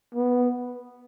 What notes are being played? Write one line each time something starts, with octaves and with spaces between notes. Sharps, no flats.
B3